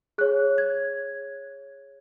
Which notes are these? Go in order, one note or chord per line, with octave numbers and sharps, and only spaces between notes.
G#4 C#5 F#6
G#6